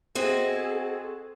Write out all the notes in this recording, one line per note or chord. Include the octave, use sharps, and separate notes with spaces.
C4 F#4 G#4 A4 D#5